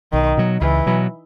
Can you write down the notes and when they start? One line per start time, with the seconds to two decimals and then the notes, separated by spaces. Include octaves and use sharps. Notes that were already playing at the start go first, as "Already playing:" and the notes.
0.13 B1 D#3
0.37 B2 F#3
0.61 C#2 E3
0.86 B2 F#3